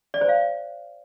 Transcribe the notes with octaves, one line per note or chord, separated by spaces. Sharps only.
D5
C5
F5